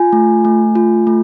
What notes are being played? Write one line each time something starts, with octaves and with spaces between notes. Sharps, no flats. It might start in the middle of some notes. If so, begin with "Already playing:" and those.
Already playing: F4 G#5
A3
A3
F4
A3